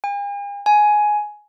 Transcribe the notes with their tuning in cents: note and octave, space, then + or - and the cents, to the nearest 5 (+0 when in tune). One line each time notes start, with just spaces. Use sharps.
G#5 -45
G#5 +10